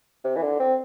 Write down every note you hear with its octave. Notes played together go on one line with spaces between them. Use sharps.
C3
E3
D3
C4